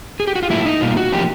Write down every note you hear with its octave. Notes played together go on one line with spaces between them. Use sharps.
G#4
G4
F#4
F4
A2 F#3 A#3 E4
D#4
B2 G3 A#3 F4
F#4
F3 A#3 C#4 G4